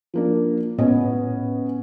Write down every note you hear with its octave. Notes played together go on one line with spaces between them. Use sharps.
F3 A#3 D4
A2 B3 C#4 D#5